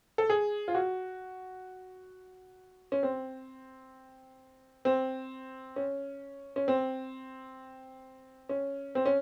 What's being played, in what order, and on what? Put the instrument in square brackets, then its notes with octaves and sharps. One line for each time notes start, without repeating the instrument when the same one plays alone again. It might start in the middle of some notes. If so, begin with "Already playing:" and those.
[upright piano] A4
G#4
F4
F#4
C#4
C4
C4
C#4
C#4
C4
C#4
C4
C#4